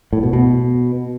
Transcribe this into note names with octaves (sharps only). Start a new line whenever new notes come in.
A2
B2
B2